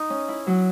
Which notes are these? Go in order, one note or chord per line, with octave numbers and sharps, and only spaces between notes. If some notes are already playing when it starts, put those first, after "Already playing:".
Already playing: D#4 D#6
C#4
E4
F#3